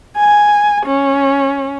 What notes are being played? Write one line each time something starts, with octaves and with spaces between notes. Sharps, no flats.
G#5
C#4